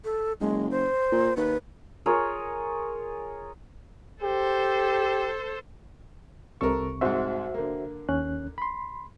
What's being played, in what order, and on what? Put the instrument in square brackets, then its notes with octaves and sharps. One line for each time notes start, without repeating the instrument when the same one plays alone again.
[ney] A4
[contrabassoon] F#1 [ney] G#3
[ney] C5
[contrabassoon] A#2
[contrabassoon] D#2 [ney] B4
[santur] F4 G#4 A#4 C#5
[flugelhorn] G4 [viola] A4 C5
[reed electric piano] C2 C3 C#6 [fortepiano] A4 A#4
[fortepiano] C2 G#2 [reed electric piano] F#4 C5 E5
[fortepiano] D3 A#3
[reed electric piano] D#2 C#4 F#6
B5 C6